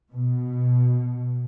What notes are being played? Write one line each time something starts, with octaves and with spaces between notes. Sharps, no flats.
B2